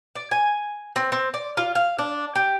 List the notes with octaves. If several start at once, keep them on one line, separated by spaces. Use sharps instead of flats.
D5
G#5
C4
C4
D5
F4
F5
D4
G4